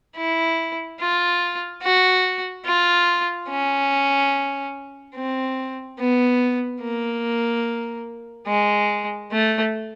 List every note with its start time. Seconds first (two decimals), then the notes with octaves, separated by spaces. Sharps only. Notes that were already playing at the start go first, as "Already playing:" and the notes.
0.16 E4
0.99 F4
1.82 F#4
2.65 F4
3.49 C#4
5.15 C4
5.99 B3
6.82 A#3
8.47 G#3
9.31 A3